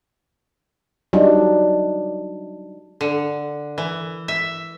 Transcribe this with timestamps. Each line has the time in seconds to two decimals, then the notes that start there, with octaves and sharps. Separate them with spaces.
1.13 F#3 G3 D4 D#4
3.01 D3
3.78 E3
4.28 E5